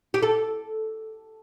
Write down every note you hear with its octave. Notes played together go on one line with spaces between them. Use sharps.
G4
A4